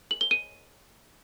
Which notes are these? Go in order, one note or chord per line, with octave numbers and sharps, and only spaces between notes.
F#7
G7
D#7